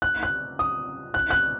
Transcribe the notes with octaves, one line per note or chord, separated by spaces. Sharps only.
F#6
F#6
D#6
F#6
F#6